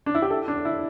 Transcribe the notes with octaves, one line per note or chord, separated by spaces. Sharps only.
D4
E4
G4
A4
D4
E4